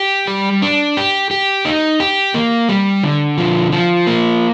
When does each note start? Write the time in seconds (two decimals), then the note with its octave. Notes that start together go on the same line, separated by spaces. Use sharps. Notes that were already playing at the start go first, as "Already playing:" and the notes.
Already playing: G4
0.27 G3
0.62 D4
0.97 G4
1.31 G4
1.65 D#4
2.00 G4
2.34 A#3
2.69 G3
3.03 D3
3.38 F3
3.72 F3
4.07 A#3